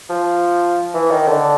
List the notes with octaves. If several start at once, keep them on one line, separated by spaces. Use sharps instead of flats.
F3
E3
D#3
D3